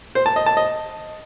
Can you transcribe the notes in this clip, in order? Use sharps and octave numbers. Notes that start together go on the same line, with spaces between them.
C5
A5
D#5
A5
D#5